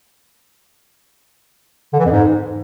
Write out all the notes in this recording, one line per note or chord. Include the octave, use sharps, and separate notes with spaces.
D3
E3
F2
G#2